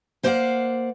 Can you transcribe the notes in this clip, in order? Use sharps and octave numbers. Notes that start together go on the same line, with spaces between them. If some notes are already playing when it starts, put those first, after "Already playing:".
A#3 C5 D5 D#5 F5 F#5